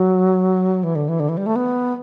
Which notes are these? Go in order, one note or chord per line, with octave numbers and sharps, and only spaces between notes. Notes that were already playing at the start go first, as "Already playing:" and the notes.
Already playing: F#3
E3
D3
E3
D3
E3
G3
A3
B3